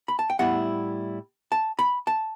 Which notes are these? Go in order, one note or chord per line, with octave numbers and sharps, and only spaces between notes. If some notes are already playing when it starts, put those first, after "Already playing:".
B5
A5
G5
A2 G3 B3 E4 F#5
A5
B5
A5